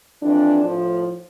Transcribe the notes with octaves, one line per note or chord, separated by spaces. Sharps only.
F2 E3 D4
A2 F3